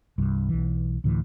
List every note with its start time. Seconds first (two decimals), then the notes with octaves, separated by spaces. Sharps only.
0.18 C2 G2
0.49 B1 E3
1.04 D2 A2 E3